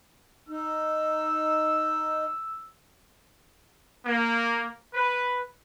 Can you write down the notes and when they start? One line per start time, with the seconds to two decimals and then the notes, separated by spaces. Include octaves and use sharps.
0.49 D#4 E6
4.05 A#3
4.94 B4